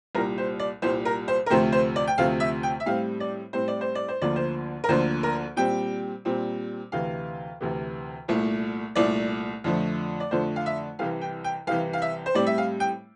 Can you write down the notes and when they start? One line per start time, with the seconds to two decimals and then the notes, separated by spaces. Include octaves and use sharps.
0.15 C2 A#2 G3 A#4
0.38 C5
0.59 D5
0.82 C2 A#2 G3 C5
1.05 A#4
1.28 C5
1.46 A#4
1.50 D2 C3 F3 A3 C4 C5
1.72 C5
1.96 D5
2.07 G5
2.18 D2 C3 F3 A3 C4 F5
2.40 E5
2.63 G5
2.80 E5
2.86 A2 G3 C4 F5
3.20 D5
3.53 A2 G3 C4 C5
3.68 D5
3.81 C5
3.95 D5
4.08 C5
4.22 D2 D3 F3 A#3 D5
4.36 C5
4.84 A#4
4.89 D2 D3 F3 A#3 C5
5.23 A#4
5.56 A#2 G3 C4 G5
6.25 A#2 G3 C4
6.92 D2 C3 E3 F5
7.61 D2 C3 E3
8.28 C2 A#2 A3
8.95 C2 A#2 A3 D5
9.64 F2 D3 F3 A3
10.20 D5
10.31 F2 D3 F3 A3 C5
10.56 F5
10.66 E5
10.99 C2 C3 E3 F5
11.22 G5
11.44 G5
11.67 C2 C3 E3 F5
11.93 F5
12.02 E5
12.26 C5
12.35 A2 G3 C4 D5
12.47 E5
12.58 F5
12.80 G5